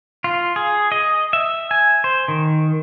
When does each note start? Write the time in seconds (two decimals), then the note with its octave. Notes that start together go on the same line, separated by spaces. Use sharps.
0.24 F4
0.56 G#4
0.92 D#5
1.33 E5
1.71 G#5
2.04 C5
2.28 D#3